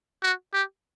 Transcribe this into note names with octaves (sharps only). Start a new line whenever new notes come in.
F#4
G4